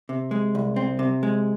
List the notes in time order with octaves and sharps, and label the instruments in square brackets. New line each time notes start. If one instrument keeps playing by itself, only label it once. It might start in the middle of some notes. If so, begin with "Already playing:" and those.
[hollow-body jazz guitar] C3
G#3
C2
C4
C3
G#3